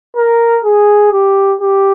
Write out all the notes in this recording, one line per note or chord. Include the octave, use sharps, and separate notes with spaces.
A#4
G#4
G4
G4